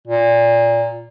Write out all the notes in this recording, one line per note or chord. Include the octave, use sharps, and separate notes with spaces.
A#2